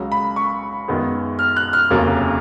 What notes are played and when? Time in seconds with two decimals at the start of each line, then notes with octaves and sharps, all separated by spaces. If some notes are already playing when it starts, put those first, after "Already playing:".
Already playing: C#2 C#3 F#3
0.12 B5
0.36 C#6
0.88 F#2 D#3 G#3 B3
1.39 F6
1.57 F#6
1.73 F6
1.90 F1 D#2 C#3 F#3 A#3